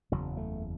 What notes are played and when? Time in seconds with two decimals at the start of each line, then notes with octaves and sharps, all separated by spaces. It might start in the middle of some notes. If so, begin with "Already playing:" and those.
0.12 F#1 E2 C#3 F#3
0.37 A3